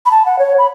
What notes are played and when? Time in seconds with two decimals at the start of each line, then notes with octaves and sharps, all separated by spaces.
0.06 B5
0.11 A5
0.26 F#5
0.39 C#5
0.58 B5